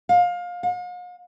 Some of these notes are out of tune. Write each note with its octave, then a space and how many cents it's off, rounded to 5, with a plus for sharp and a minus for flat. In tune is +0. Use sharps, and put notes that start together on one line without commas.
F5 +25
F5 +45